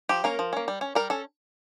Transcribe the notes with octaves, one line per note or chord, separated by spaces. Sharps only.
F3 G4
A#3 C#4 A#4
F3
A#3 C#4
G3
C#4
G3 A#4
C#4 A4